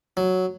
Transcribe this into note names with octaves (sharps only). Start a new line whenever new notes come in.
F#3